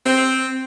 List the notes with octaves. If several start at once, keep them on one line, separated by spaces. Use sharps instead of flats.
C4